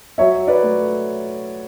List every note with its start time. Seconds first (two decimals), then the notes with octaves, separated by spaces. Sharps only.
0.18 F#3 C#5 E5
0.47 B4 D5
0.63 A3